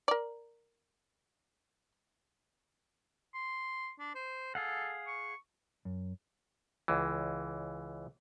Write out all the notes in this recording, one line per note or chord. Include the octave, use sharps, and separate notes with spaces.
A#4 D5
C6
D4
C5
G#4 A4 F5 F#5
C#6
F#2
C#2 E3